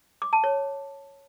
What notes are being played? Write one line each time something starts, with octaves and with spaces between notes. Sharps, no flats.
D6
A5
C#5